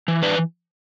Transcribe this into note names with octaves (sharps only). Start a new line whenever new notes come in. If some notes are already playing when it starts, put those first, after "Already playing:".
E3
D4 B4